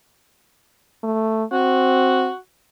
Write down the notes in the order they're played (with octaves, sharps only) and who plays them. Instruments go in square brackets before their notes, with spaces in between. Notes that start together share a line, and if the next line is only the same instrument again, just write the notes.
[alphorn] A3
[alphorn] C4 [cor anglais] F#4